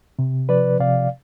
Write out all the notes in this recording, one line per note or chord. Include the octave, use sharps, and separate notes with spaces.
C3
F3 B4 D5
C3 D5 F5